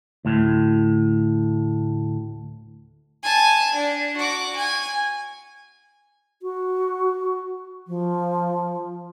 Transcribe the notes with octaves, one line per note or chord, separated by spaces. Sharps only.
D2 A2
G#5 A5
D4
F#4 D6
G#5
F#4
F3